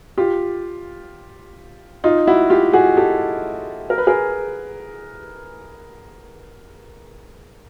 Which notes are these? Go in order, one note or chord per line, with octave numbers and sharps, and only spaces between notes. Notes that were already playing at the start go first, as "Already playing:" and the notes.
F4 G4
D#4 F4
E4 F#4
F4 G4
F#4 G#4
G4 A4
A#4
B4
G#4 A#4